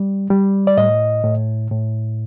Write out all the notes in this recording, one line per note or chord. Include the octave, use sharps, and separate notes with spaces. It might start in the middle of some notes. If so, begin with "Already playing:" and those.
Already playing: G3
G3
D5
A2 D#5
A2
A2